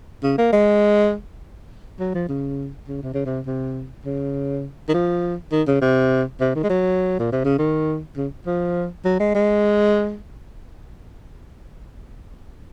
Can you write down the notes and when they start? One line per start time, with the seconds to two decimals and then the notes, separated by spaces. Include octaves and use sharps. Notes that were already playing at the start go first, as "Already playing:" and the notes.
0.23 C#3
0.38 A#3
0.53 G#3
1.99 F#3
2.14 F3
2.29 C#3
2.88 C#3
3.03 C3
3.14 C#3
3.25 C3
3.46 C3
4.05 C#3
4.89 D#3
4.94 F3
5.52 D#3
5.67 C#3
5.82 C3
6.40 C3
6.55 D#3
6.63 G#3
6.70 F#3
7.19 A#2
7.32 C3
7.45 C#3
7.58 D#3
8.17 C#3
8.46 F3
9.05 F#3
9.20 G#3
9.35 G#3